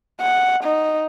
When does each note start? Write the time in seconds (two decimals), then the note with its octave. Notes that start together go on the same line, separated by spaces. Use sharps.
0.21 F#5
0.64 D#4